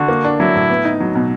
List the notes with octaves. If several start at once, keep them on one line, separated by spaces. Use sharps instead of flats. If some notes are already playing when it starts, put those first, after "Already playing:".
Already playing: D3 F#4
A#3
D4
F#3 E4
A2
B3
D#4
F#3
B2